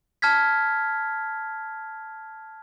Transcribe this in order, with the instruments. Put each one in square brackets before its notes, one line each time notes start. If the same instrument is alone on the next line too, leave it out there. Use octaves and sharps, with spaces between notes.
[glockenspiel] A5 F6 G#6 B6